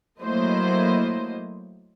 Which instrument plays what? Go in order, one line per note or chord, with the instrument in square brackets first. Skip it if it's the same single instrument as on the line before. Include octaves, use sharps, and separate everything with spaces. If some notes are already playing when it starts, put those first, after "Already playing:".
[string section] F#3 A3 A#3 E4 C5 D#5